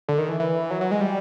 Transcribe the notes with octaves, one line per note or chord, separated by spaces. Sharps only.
D3
D#3
E3
E3
F#3
F#3
G#3
G3